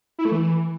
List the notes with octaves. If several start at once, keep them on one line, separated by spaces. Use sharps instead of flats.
E4
A3
E3